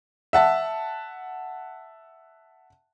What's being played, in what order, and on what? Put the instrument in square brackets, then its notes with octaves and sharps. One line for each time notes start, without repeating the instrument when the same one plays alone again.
[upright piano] E5 F#5 A5